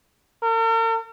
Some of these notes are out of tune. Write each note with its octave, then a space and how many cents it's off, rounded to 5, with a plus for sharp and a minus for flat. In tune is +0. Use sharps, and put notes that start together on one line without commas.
A#4 -45